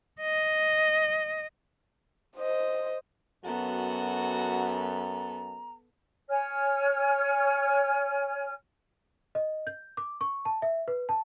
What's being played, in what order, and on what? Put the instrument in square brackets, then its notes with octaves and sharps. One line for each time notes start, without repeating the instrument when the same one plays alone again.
[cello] D#5
[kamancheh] C5 D#5
[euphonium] F#2 [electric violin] B3 A4 [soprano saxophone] F#4 [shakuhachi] A#5
[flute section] C#5 G#5 F6
[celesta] D#5
G6
D6
C#6
A5
E5
B4
A5